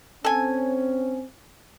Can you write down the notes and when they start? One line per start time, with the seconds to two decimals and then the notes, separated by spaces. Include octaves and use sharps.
0.24 C4 C#4 A4 G#5